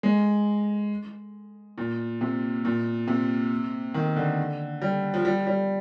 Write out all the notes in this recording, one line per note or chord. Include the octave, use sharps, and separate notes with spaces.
G#3
A#2
C3
A#2
C3
D#3
D3
G3
F3
G3
G3